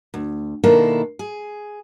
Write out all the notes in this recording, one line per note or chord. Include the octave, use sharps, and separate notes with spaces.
D2
B2 D#3 A#3 D4 E4 A4
G#4